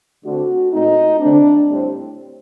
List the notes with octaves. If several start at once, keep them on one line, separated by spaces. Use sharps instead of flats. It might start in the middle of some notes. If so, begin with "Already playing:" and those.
D3 A3 C4 F#4
A#2 A3 C4 D#4
D3 A3 C4 D4
A2 G3 C4